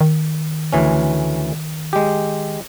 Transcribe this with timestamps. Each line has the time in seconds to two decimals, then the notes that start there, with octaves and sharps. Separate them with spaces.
0.01 D#3
0.73 D2 E3 C#4
1.93 G#3 G4